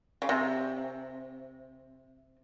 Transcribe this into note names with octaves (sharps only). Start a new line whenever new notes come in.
C#3
C3